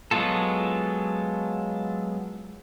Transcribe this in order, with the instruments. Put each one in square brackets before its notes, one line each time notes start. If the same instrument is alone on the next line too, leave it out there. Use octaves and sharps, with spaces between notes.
[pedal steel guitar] F#3 G#3 B3 F4 A4